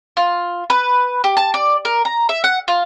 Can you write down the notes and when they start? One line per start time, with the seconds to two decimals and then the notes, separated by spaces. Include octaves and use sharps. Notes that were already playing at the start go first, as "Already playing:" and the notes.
0.17 F4
0.70 B4
1.24 G4
1.37 A5
1.54 D5
1.85 A#4
2.05 A#5
2.29 E5
2.44 F#5
2.68 F4